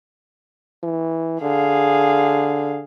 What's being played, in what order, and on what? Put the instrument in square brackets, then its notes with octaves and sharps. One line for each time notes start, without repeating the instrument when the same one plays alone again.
[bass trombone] E3
[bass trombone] D3 [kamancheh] G#4 F5